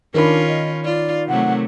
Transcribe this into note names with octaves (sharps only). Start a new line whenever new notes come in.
D#3 C#4 D4 F4 A#4 B5
D#5
F4 D5
C3 F#3 A3 F#5